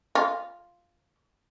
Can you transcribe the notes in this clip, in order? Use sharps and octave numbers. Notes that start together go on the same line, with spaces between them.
F4